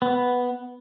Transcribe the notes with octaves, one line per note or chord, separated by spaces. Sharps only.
B3